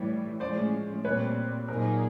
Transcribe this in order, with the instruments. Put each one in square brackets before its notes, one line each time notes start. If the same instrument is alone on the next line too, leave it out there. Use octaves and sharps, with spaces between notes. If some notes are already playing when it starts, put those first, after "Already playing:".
Already playing: [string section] A2 E3 G3 [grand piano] C#5
[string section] A2 F3 G#3 C#4 [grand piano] C5 D5
[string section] A#2 G3 C4 [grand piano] B4 C#5
[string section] A#2 F#3 A#3 D#4 G#4 [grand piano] A#4 C5